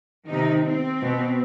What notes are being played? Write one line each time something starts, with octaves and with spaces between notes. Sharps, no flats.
C3 D#3 D#4
C4
B2